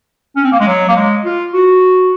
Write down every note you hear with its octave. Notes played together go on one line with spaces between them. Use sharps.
C#4
C4
A#3
G#3
F#3
A#3
G#3
F4
F#4